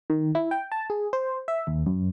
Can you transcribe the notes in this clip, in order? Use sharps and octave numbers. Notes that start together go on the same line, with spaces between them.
D#3
E4
G5
A5
G#4
C5
E5
D#2
F#2